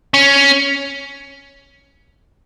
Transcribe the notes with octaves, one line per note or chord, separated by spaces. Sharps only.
C#4